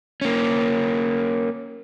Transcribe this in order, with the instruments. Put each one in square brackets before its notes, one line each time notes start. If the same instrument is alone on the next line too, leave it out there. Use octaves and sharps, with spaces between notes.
[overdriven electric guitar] A#3 C#4